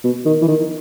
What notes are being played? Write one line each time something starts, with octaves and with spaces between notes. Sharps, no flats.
B2
D#3
E3
D#3